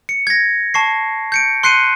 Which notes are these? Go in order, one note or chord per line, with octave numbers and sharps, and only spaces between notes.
C#7
G#6 A#6
A5 C#6 C7
G6 C#7 D7
C6 F#6 C7 C#7 D#7